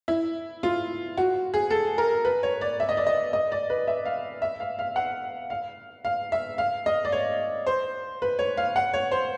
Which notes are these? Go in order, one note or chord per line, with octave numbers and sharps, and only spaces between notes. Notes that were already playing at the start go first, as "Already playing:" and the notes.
E4
F4
F#4
G#4
A4
A#4
B4
C#5
D5
E5
D#5
D5
D#5
D#5
D5
B4
E5
F5
E5
F5
F5
F#5
F5
F5
E5
F5
D#5
D5
C#5
C5
B4
C#5
F5
F#5
C#5
C5